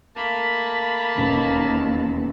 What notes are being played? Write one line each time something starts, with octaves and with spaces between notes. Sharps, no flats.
A3 A#3 A5 B5
E1 D#2 B2 C#4